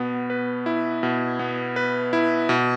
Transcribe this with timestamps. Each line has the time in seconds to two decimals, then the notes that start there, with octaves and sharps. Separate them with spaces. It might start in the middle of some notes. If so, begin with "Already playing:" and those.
Already playing: B2 B3
0.30 B4
0.66 E4
1.03 B2
1.39 B3
1.76 B4
2.13 E4
2.49 B2